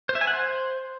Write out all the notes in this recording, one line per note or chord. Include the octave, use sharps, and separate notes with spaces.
C5
E5
G#5
F#5
C5